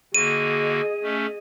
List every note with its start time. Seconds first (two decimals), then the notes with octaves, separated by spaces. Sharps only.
0.15 D3 A#3 F#4 G#4 D#5 D#7
1.03 A3 C#4